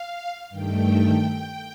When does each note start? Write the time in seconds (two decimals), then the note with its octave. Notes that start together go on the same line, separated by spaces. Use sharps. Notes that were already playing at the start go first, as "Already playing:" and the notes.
Already playing: F5
0.50 G2 D#3 A3 G5